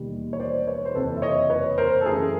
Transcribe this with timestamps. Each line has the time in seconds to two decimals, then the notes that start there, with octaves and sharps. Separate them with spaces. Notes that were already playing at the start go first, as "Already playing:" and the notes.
Already playing: E1 D#2 D#3 G3
0.33 C#5
0.40 C5 D5
0.68 B4 C#5
0.85 C5
0.95 F#1 F2 C3 E3 A4 B4
1.17 E5
1.22 C#5 D#5
1.50 B4 C#5
1.78 A#4 C5
2.01 A4
2.05 F#2 C#3 E3 A3 G#4 A#4